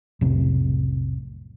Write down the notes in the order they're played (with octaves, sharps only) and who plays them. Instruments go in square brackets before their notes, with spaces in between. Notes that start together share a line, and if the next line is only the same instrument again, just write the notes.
[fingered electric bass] B1 F2 A2 C3